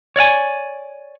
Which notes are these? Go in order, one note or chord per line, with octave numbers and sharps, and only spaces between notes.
C#5 D5 F5 G#5